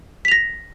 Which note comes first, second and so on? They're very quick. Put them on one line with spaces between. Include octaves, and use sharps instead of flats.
B6 F7 A#6